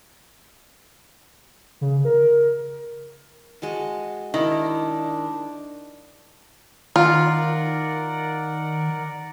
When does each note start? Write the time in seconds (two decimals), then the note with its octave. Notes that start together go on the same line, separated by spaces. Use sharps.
1.81 C#3
2.05 A#4
3.62 G#3 F#4 A5
4.34 D#3 D4 E4
6.96 D#3 F4 A#4 D5 F#5